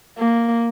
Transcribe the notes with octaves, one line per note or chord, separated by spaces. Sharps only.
A#3